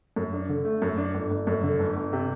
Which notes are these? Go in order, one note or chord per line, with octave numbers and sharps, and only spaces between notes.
F#2
D4
D3
A3
F#2
D4
G1
G1
F#2
D3
G1
G1
C3